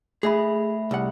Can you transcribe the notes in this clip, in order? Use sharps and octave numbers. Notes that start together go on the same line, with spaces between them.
A3 G#4 E5 B5
C2 F#5